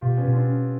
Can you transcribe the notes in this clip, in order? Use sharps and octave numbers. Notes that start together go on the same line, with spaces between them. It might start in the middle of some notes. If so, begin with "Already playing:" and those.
B2 F4 G4
B3 C#4
B2
C4 D4
C#4